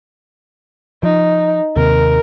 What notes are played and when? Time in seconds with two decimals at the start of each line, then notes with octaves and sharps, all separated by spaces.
1.03 F3 D#4
1.77 D#2 C3 A#4